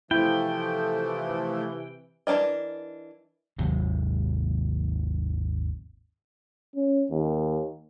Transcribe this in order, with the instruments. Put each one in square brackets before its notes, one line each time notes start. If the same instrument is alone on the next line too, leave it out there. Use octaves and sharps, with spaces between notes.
[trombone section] C3 E3 [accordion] F3 A3 [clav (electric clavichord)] E4 [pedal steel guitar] G5
[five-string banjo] E3 C#4 D4 A#4 D#5
[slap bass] G#1 D#2 C3 F#3
[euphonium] C#4
D#2